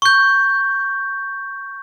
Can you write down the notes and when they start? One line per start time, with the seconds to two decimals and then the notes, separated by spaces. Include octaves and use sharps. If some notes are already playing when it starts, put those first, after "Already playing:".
0.02 C#6 G6